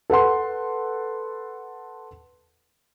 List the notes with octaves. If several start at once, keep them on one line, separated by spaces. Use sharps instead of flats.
A4 B4 F#5 C6